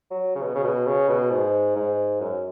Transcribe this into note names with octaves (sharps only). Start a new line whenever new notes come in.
F#3
C#3
B2
C#3
B2
C#3
B2
G#2
G#2
F#2